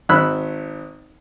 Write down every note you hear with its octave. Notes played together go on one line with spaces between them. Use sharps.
G#1 B5 E6 F#6